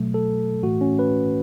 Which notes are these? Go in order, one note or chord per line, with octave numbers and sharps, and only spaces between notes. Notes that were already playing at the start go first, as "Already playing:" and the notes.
Already playing: B2 F#3 A3
A4
A2 E3 A3 F#4
C#4
B4